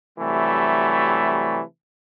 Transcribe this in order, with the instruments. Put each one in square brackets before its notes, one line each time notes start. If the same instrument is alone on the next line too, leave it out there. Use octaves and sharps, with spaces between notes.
[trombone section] C3 E3 F#3 G3 A3